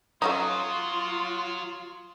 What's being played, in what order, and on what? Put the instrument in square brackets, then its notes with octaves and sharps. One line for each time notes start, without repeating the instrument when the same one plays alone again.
[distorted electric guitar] F#3 [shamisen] A3 C#4 D#4 [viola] F4 C6 [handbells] D#6